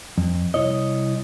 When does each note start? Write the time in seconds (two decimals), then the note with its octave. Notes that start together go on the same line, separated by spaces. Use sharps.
0.18 F2
0.54 C2 E4 C#5 D#5